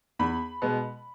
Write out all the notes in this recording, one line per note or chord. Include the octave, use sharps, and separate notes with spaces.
E2 B5
B2 G#3 B3